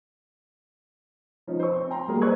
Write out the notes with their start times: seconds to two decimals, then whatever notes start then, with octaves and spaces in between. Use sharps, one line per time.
1.47 F3 C#4 D#4
1.60 C5 C#6
1.76 C4
1.91 G5 A#5 C6
2.07 F#3 G3 A#3 G#4 A#4
2.22 B4 C5 D5 C#6 F#6 G#6